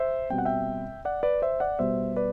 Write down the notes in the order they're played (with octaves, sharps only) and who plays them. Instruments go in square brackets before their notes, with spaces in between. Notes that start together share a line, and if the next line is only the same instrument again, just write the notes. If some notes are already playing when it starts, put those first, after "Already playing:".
Already playing: [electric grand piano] C5 E5
B2 G3 C4 G5
F#5
E5 G5
D5 F#5
B4 D5
C5 E5
D5 F#5
B2 G3 B3 C5 E5
B4 D5